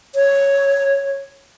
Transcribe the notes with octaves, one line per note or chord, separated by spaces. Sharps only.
C#5